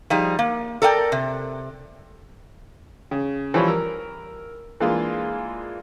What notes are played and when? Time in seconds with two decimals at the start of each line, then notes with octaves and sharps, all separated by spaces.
0.10 F3 G3 D#4 G#4
0.39 A#3
0.82 A4 A#4 D5 F#5 G5
1.12 C3
3.11 C#3
3.54 E3 F3 G3 C#5 B5
3.68 A#4 E6
4.80 E3 G#3 A#3 D4 F4 G#4